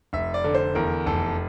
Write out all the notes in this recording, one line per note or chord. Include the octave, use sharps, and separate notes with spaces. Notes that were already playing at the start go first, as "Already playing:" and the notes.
F1 E5
D5
D3
C5
E2 A#4
F1 A4